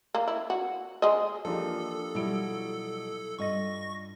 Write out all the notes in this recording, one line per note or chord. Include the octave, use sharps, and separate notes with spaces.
A#3
E4
F#4
G#3 D#5
E3 F3 A#3 D4 G4 A4
B2 F#3 G3 E4 D7
G2 F4 D#5 C#6 A#6